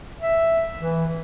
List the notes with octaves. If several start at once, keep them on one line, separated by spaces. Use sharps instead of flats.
E5
E3